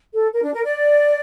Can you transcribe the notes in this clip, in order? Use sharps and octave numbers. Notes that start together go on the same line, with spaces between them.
A4
A#4
D4
A#4
D5